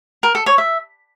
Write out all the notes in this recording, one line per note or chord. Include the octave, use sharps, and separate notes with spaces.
A#4
A4
C#5
E5